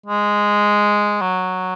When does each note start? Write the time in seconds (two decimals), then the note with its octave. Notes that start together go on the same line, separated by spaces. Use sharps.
0.06 G#3
1.21 F#3